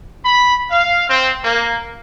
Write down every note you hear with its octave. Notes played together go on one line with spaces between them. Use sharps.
B5
F5
C4
A#3